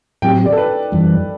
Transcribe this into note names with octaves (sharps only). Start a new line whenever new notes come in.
A2 F#3 C4 G4 G5
D5
A4
B4
F#2 E3 G3